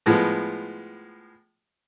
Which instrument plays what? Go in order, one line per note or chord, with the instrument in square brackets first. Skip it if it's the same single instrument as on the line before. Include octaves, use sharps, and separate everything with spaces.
[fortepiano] A2 F3 G#3 B3